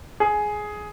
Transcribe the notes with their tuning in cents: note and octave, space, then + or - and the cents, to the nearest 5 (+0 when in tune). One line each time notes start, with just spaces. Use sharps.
G#4 +10